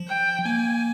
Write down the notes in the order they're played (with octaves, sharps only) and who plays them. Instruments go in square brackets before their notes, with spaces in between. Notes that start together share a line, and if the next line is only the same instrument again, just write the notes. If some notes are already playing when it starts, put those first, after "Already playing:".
Already playing: [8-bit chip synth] F3
[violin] G5
[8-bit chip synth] A#3 [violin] G#5